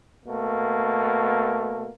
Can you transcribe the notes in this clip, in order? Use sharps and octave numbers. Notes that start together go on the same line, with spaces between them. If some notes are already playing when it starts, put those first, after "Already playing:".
B2 A3 A#3